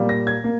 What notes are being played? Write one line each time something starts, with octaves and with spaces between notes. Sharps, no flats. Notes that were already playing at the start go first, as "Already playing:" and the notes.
Already playing: A#2 G3 A#3
A#6
G#6
A#3